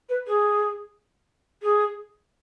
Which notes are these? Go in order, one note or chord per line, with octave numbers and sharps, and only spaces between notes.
B4
G#4
G#4